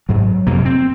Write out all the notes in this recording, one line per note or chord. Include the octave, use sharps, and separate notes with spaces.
G#2 F#3
F2 C3 A#3
C4